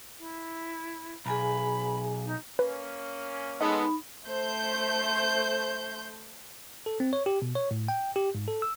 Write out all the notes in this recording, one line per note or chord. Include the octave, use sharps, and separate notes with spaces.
E4
B1 G#4 G#5 A#5 B5
D#4
A#3 C#4 B4
G#3 B3 D#4 A4 D#5 B5
A3 C5 G6
A4
C4
C#5
G4
B2
C#5
A2
G5
G4
G#2
A4
E6